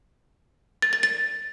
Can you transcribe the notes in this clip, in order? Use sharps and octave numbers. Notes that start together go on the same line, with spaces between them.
A6
A6
A6